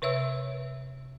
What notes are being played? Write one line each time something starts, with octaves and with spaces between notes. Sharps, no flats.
C3 B4 C#5 E5 E6